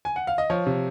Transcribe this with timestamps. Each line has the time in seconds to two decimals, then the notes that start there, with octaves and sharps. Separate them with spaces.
0.05 G#5
0.16 F#5
0.27 F5
0.38 D#5
0.50 F3 C#5
0.66 C3